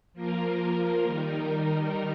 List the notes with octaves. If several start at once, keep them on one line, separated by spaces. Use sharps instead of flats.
F3 A#3 F4 A#4
D#3 G3 D#4 A#4